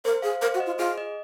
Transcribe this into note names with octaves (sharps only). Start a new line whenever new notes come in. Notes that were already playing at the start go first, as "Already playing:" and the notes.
A#4 C5
G#4 F5
A#4 C5
F#4
D#5
F4
F4 G#4
D#5